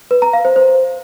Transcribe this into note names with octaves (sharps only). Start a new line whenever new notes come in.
B4
A#5
F5
C5
C5